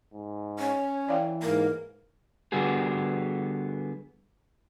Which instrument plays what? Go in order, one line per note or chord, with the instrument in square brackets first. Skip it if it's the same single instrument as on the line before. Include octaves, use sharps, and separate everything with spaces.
[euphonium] G#2
[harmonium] C#4 [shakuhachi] C#5
[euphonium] E3 [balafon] D5 F5 G5
[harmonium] G#2 A#3 [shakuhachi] A#4
[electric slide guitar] D3 G3 B3 F#4 G#4